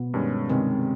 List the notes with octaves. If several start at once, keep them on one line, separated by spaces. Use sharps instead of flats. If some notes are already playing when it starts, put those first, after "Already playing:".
Already playing: B2 B3
G2 D#3 G#3 C#4
G2 C3 D#3 G#3 C4 C#4